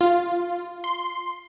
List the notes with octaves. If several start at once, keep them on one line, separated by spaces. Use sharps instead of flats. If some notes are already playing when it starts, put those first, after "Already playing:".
F4
C6